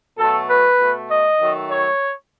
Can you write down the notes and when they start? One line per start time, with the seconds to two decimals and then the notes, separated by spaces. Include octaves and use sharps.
0.18 B2 F#3 A3 A4
0.49 B4
0.79 B2 A3
1.09 D#5
1.39 D#3 F#3 A3
1.69 C#5